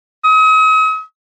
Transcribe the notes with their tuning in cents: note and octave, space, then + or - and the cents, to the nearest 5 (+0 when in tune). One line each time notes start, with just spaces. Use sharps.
D#6 +40